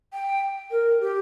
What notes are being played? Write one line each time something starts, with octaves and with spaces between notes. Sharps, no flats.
G5
A#4
G4